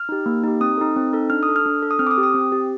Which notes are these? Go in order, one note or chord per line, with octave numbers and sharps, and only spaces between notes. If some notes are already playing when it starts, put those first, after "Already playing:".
Already playing: F6
D#4 G4
A#3
D#4 G4
C4 D#6
D#4 A4
C4
D#4 A4
D4 F6
D#6
A4
F6
D4
A4
D#6
C4 F6
D6
D#6
G4
D#6
C4
G4